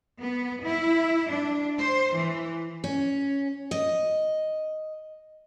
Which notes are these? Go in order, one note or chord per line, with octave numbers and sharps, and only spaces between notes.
B3
E4
D4
C5
E3
C#4
D#5